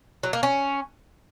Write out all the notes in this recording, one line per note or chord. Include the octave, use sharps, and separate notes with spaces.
F#3
A#3
C#4